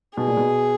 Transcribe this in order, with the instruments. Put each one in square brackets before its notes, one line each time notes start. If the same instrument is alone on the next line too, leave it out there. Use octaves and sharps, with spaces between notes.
[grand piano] B2 [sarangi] G#4
[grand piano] A#2
B2